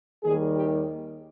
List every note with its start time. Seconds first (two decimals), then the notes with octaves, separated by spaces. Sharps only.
0.23 D#2 D#3 G3 G#4
0.56 G4